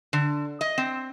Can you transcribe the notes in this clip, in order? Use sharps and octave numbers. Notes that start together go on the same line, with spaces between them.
D3
D#5
C4